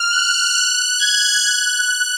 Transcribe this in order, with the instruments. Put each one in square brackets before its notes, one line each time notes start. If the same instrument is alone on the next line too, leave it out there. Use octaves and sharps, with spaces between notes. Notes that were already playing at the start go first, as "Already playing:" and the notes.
Already playing: [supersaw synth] F6
F#6
F#6
G#6
F#6